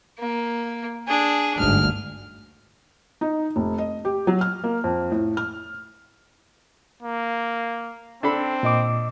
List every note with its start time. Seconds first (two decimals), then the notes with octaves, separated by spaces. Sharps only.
0.19 A#3
1.07 D4 G#4
1.59 G1 D2 G#2 F6
3.21 D#4
3.56 F1
3.78 D#5
4.05 G4
4.27 F#3
4.41 F6
4.64 A#3
4.84 F2
5.11 A2
5.37 F6
7.03 A#3
8.23 C4 D4 A4 B5
8.63 A#2 D#5 D6